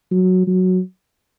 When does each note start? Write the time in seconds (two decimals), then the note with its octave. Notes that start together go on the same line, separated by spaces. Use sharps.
0.11 F#3
0.47 F#3